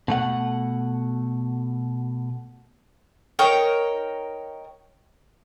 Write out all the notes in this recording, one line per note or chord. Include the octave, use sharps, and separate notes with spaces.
B2 A3 F#5
D#4 A#4 C#5 G5